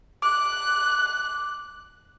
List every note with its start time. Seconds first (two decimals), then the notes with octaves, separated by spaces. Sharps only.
0.22 D6 F#6